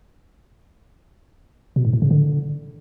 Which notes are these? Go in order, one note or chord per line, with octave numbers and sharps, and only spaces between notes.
B2
G#2
A2
C#3
D3